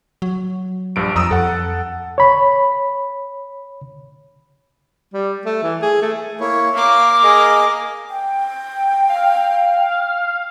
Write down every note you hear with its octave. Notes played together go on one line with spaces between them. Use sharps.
F#3
A#1 G2 D7
F2 A#5 D#6 E6
F2 A4 F#5
C#5 B5
G3
A3
E3
G#4
A3
A#3 E4 C#5
A#3 F5 D6
G#4 A#4 D#5
G5
F5